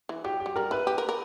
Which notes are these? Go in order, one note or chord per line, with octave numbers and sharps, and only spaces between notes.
E3
F#3 G4
G4
F#3
G3 A#4
E4 B4
G4
A#4
A#4